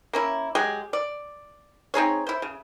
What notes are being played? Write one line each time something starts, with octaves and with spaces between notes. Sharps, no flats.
A#3 C#4 E4
F#3 G#3 G4 G#4
D5
C4 D#4 G#4 C#5
E4 C5
C#3